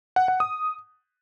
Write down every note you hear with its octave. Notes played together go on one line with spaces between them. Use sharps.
F#5
F#5
D#6